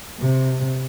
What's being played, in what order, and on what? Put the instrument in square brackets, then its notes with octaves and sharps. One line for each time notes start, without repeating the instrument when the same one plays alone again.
[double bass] C3